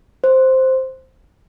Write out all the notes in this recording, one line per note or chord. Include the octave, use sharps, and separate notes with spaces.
C5